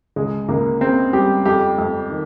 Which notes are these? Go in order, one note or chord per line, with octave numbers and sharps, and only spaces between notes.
C#2 G#3
C#2 A#3
C#3 C4
G3 G4
F2 G4
F2
D#3